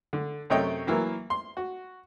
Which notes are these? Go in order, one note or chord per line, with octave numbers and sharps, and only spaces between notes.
D3
F#2 C3 A3 C#5 D#5 G5
E3 F#3 A#3 E4
C6
F#4